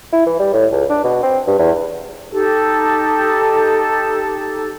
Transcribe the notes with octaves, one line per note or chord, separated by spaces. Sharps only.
E4
E3
G3
A2
C#2
D4
B2
C4
G2
E2
D#4 G4 A4